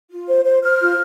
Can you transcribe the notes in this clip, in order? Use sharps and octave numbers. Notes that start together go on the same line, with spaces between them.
F4
C5
C5
C5 F6
F4